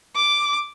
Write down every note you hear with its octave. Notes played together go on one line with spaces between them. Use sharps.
D6